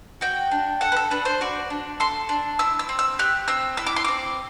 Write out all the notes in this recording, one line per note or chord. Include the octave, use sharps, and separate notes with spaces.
F#4 G5
D4
A4 F#5
B4
A4
D4 B4
C5
F#4 D5
D4
A4 C6
D4
E4 E6
E6
C4
E6
G4 F#6
C4 E6
E4 E6
D6
C6
C4 D6